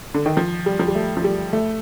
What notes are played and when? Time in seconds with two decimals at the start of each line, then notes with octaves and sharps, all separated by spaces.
0.14 D3
0.26 D#3
0.37 F3
0.66 G3
0.79 F3
0.88 G3
0.95 A3
1.17 F3
1.24 G3
1.53 A3